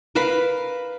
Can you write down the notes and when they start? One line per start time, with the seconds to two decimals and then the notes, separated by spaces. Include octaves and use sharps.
0.15 A#4 B4 F5 B5